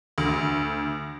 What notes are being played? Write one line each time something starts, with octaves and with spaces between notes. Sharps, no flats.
D2